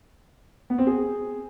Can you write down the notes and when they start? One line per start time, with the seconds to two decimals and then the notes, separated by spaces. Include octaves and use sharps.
0.70 B3
0.78 C4
0.87 G#4